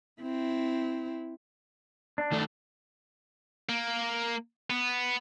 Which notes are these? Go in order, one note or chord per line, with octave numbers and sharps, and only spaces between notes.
C4 E4
D4
D#3 A3 A4
A#3
B3